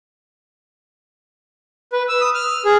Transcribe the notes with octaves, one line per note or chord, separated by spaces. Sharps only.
B4
E6
D#6
F6
G#4